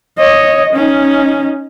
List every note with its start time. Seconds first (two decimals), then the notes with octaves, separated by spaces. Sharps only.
0.18 C#5 D#5
0.73 C#4 D#4